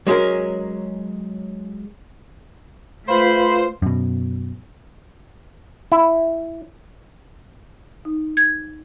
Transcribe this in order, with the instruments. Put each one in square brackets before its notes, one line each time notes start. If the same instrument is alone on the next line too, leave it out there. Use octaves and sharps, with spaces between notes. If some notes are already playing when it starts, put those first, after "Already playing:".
[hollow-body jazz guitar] F#3 G#3 C#4 G#4 A#4
[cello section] A3 [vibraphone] F4 B4 F5 [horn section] C5 [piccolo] B5
[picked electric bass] F#2 B2
[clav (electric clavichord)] E4
[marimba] D#4
G#6